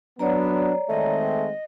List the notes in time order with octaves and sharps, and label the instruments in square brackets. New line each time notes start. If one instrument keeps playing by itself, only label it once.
[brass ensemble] F#3 B3 [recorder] D4 [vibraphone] C#5 D5 A#5
[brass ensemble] D#3 G#3 C4 [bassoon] A3 [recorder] D#5